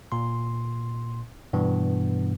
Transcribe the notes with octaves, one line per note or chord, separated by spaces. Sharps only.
A#2 C6
G2 B2 E3 B3